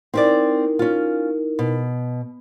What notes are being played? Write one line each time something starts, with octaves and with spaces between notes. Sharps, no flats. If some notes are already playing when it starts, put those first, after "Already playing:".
C4 C#4 D#4 E4 A#4 D5
C#4 F4
B2